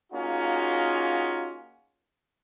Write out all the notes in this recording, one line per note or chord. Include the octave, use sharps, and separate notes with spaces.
A#3 C#4 D#4 F4 F#4 G#4